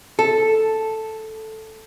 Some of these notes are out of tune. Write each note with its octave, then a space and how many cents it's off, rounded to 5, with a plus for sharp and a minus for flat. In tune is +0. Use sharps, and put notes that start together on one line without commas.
A4 +0